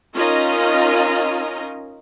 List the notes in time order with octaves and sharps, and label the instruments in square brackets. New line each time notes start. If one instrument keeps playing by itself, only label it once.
[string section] C#4 D#4 F4 A#4 D#5